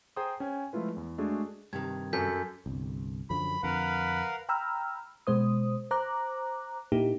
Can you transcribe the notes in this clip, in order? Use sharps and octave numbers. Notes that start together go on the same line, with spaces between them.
G#4 C5 G5 A#5 C6 D#6
C#4 G5 G#5
F3 G#3 A3 E4 F4 B4
E2
G#3 A3 D4 F#4 G#4
G2 C3 D#3 G#6
F#2 A4 G#5 G6 B6
G1 C2
F#2 D3 F3 B5
F2 D3 A#4 B4 F5 F#5
G5 A#5 B5 E6 F6
B2 G#3 C5 D#6
C5 A#5 D6 F#6
A#2 A#3 D#4 E4 G4